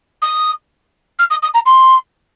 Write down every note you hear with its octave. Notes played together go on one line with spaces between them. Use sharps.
D#6
F6
D#6
D#6
A#5
C6